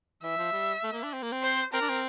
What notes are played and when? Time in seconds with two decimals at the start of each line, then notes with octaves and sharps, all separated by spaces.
0.23 E3 E5
0.38 F3
0.52 G3
0.83 A3
0.92 A#3
1.03 D4
1.13 C4
1.22 A#3
1.32 C4
1.42 C5
1.73 C4 A#4
1.81 D4
1.89 C4